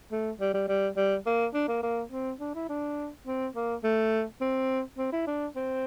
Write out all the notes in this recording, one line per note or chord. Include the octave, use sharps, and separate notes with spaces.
A3
G3
G3
G3
G3
A#3
D4
A#3
A#3
C4
D4
E4
D4
C4
A#3
A3
C4
C4
E4
D4
C4